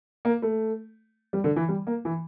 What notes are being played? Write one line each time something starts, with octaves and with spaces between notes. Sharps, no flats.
A#3
A3
G3
D3
E3
G3
A#3
E3